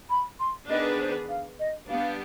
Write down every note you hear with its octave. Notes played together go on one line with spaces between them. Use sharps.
B5
C6
D#3 B3 D4 G#4 B4 D#5
C5
F5
D#5
G3 B3 D4 G4 F5